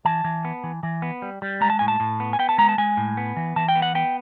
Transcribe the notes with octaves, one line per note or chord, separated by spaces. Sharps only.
E3 A5
E3
B3
E3
E3
B3
G3
G3
G#3 A#5
A5
A2 G#5
A5
A2
B3
G#5
B3 G5
A5
G#3 A#5
A5
G#3 G#5
A2
B3
E3
E3 A5
G5
B3
F#5
B3 G5